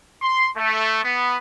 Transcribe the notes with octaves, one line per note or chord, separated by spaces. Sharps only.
C6
A3
B3